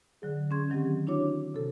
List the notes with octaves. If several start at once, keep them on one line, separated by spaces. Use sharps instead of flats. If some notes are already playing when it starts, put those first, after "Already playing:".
D3 F#3 G#4
C#4 G#4 C6 G#6
D#3 F#3 C4 G4
D4 E4 F#4 C#5 D6
C3 A4